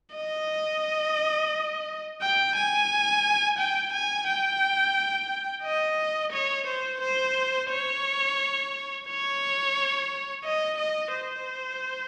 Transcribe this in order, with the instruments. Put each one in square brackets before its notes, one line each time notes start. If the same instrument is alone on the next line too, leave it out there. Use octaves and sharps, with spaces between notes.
[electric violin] D#5
G5
G#5
G5
G#5
G5
D#5
C#5
C5
C5
C#5
C#5
D#5
D#5
C5